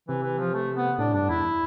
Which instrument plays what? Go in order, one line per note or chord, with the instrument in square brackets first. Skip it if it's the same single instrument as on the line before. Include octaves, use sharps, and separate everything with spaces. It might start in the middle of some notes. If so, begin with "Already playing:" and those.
[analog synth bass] C3 [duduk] E3
[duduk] E3
F3
A3
B3
[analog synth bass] A2 [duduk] D4
[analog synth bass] G2 [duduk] D4
[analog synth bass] E2 [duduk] E4